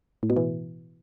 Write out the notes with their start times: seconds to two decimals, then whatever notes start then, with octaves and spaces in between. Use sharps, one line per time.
0.23 A2
0.30 B2
0.36 E3